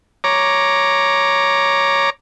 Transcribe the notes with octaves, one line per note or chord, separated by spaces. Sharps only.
C#5 A#5 D6